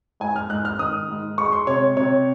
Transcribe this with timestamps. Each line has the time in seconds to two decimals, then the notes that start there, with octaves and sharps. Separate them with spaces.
0.20 G#2 G#5
0.36 F6
0.50 G#2 F#6
0.65 F6
0.79 D#3 D#6
1.08 G#2
1.38 G#3 C#6
1.52 C6
1.67 C3 C#5
1.96 C3 C#5